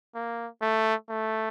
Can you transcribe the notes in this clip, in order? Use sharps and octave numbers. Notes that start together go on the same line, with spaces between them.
A#3
A3
A3